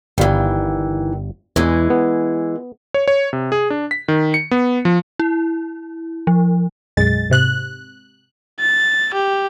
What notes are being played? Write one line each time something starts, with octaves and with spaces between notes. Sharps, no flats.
G1 D#3 E3 G3 F5
E2 E3 G#3
B3
C#5
C#5
C3
G#4
D4
B6
D#3
C#7
B3
F3
E4
F3
B1 F#2 G#3 A6
G#2 C3 F#6
A6
G4